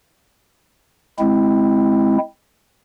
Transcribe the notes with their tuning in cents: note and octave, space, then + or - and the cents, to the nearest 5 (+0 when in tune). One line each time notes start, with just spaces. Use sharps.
G#3 +5 C4 +0 E4 +0